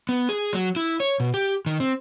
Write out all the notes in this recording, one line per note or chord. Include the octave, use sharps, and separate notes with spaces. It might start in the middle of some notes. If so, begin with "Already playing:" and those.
B3
G#4
F#3
E4
C#5
B2
G4
D#3
C4